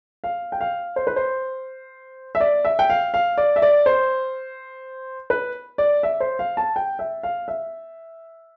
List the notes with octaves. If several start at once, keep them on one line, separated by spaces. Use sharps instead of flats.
F5
G5
F5
C5
B4
C5
E5
D5
E5
G5
F5
F5
D5
E5
D5
C5
B4
D5
E5
C5
F5
A5
G5
E5
F5
E5